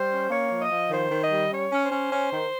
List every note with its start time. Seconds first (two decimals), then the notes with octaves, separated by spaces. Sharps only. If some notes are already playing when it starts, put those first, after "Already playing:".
Already playing: G3 C5
0.10 C#4
0.30 A#3 C#5
0.50 F3
0.60 D#5
0.70 F3
0.90 D#3 C5
1.11 D#3
1.21 D#5
1.31 G3
1.51 C#4 C#5
1.72 C#4
1.82 C5
1.92 C#4
2.12 C#4
2.32 D#3